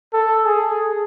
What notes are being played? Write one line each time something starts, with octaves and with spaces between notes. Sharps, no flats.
A4
G#4